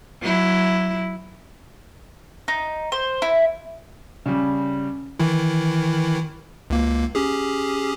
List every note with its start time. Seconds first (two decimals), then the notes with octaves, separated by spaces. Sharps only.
0.22 F#3 E4
2.48 D#4
2.92 C5
3.22 E4
4.26 C#3 G3
5.19 D#3 E3 E4
6.70 C#2 A#3
7.15 C#4 G4 G#4